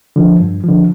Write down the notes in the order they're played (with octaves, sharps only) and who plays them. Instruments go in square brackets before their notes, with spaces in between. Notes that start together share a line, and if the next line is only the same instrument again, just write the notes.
[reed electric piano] D3 F3
G2
D3 F3